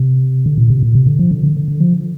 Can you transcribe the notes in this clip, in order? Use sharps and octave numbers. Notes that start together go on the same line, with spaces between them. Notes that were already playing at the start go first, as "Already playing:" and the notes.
Already playing: C3
D3
A#2
C3
A#2
C3
D3
F3
D3
D3
D3
D3
F3